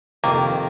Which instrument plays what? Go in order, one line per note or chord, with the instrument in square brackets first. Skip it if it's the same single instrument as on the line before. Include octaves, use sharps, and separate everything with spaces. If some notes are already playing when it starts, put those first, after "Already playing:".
[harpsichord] F2 C3 D#3 [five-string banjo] A#3